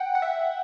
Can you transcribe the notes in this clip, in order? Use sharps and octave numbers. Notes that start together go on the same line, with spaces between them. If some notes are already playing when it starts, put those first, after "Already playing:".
Already playing: F#5 G5
F#5
E5